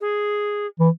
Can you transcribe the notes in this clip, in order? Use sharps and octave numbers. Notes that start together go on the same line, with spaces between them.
G#4
E3